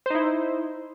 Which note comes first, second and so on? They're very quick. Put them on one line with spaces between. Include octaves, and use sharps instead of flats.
C5 D#4 E4